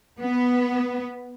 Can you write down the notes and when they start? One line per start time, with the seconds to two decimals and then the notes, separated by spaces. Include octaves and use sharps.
0.21 B3